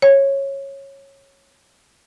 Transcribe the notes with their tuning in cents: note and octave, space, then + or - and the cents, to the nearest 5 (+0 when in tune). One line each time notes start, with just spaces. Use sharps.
C#5 -15